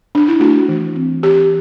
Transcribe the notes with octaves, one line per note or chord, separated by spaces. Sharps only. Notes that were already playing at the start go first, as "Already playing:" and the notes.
D4
E4
A3 F#4
E3
C4
E3 G4